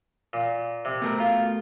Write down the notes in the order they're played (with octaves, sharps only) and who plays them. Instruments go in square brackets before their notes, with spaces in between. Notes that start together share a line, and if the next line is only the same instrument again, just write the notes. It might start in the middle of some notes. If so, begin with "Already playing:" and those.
[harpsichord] A#2
C3
[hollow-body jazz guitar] B2 A3 A#4
[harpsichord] F4